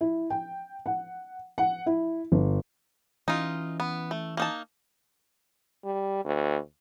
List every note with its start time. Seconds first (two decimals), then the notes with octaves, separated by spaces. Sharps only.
0.01 E4
0.30 G5
0.86 F#5
1.58 F#5
1.86 E4
2.32 G1
3.28 E3 C#4 D#4 F4
3.80 B3
4.11 A3
4.37 A#3 D#4 A5
5.85 G3
6.24 D2